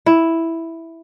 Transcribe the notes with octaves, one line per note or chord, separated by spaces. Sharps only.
E4